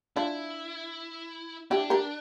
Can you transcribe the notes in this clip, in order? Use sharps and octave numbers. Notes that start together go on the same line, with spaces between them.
D4 E4 F4
D4 E4 G4
G4 A#4